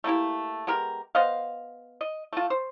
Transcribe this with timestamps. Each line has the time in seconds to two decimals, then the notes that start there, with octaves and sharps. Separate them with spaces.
0.04 A3 A#3 E4 G4
0.67 G#3 B3 G4 A#4
1.15 B3 C5 D#5 F5
2.01 D#5
2.33 A3 F4
2.50 C5